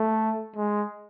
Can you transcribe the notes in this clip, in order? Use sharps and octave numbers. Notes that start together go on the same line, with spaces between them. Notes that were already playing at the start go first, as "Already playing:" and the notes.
Already playing: A3
G#3